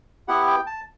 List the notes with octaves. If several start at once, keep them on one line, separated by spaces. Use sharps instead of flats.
B3 E4 G4 F#5
G5
A5